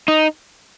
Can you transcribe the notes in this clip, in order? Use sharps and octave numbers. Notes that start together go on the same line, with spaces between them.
D#4